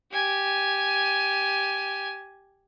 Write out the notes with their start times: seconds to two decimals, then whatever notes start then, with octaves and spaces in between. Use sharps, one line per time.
0.12 G4 G#5